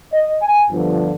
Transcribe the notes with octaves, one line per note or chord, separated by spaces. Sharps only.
D#5
G#5
G1 G2 D3 F3